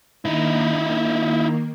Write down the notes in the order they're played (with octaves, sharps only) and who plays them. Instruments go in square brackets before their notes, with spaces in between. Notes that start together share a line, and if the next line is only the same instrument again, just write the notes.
[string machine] D#3 A#3 [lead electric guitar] D#4 E4